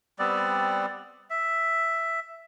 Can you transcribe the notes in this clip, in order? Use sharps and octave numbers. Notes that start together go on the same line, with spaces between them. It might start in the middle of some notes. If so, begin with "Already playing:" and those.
G3 B3 C4 D5
E5